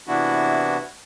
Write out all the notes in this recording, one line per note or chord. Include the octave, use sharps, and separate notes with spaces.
C3 E3 B3 D4 E4 F#4